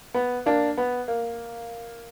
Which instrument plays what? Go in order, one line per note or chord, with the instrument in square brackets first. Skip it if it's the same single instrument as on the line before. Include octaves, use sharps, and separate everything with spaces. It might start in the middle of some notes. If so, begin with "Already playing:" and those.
[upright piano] B3
A#3 D4
B3
A#3